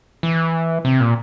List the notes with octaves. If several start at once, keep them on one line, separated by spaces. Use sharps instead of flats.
E3
C3
A#2